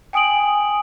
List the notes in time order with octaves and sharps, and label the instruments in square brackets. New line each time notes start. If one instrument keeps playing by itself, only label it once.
[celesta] G5 G#5 D#6 D7 F#7